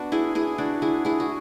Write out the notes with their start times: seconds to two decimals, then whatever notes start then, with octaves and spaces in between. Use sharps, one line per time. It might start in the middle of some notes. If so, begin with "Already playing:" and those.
Already playing: B3 D4 F#4
0.12 E4 G#4
0.35 E4 G#4
0.58 D4 F#4
0.82 E4 G#4
1.05 E4 G#4
1.20 F#4